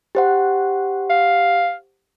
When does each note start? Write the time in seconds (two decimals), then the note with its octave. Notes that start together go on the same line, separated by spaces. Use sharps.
0.15 G4 C5 F#5
1.10 F5